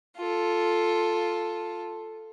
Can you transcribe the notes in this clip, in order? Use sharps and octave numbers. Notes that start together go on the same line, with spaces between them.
F4 A4